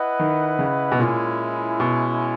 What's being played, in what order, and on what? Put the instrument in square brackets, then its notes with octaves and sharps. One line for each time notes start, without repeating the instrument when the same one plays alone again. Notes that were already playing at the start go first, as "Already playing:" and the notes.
Already playing: [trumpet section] E4 B4 D#5 F#5
[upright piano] D#3
C#3
B2
[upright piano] A#2 [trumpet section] G#3 C#4 E4
[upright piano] B2